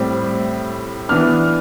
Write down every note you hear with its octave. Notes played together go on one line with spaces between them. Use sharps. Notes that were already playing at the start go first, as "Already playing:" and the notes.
Already playing: A2 G3 C4
E3 B3 D4 F6